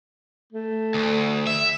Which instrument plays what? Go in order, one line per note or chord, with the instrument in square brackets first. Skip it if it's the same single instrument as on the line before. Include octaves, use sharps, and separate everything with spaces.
[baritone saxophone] A3
[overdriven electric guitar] D2
E5